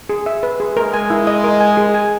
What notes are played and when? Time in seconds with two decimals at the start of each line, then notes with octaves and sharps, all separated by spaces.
0.09 G#4
0.26 E5
0.43 B4
0.60 G#4
0.77 G#3 A#4
0.93 G#5
1.10 E4
1.27 D#5
1.44 A#4
1.61 G#5
1.77 G#4
1.94 G#5